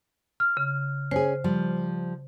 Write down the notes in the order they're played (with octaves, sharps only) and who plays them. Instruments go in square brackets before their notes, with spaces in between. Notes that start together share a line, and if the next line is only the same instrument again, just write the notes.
[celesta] F6
[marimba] C#3
[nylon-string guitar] C#4 G#4 [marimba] C5
[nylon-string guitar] F3 G3